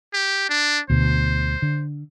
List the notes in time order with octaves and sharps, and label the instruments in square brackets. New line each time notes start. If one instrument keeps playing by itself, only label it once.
[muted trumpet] G4
D4
[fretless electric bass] D2 B2 [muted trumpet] C5
[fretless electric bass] D3